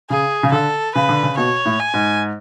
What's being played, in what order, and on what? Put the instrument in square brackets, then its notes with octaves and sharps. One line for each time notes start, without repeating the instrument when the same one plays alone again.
[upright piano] C#3 [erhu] G#4
[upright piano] C#3
[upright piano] D3 [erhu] A4
[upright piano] C#3 [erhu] B4
[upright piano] D3
C#3
[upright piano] B2 [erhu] C#5
[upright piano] A2
[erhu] G#5
[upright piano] G#2